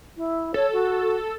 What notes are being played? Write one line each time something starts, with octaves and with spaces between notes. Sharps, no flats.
E4
A4 C#5
F#4